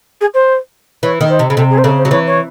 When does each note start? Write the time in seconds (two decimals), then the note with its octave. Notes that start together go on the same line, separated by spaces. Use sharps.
0.21 G#4
0.34 C5
1.03 E3 C#5
1.21 D#3
1.29 C5
1.39 C3
1.50 C#3
1.57 C3 A4
1.70 G#4
1.78 C5
1.84 C#3 A4
1.98 C5
2.05 F#3
2.11 E3 C#5
2.26 C#5